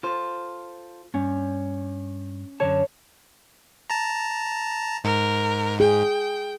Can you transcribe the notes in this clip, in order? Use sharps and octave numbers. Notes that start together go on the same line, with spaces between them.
F4 A4 C5
G2 C#4
F#2 D3 C#5 A5
A5 A#5
G#2 A#4
G#4 G5